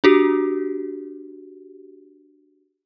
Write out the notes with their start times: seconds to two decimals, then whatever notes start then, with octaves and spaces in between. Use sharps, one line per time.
0.04 D4 F#4 G4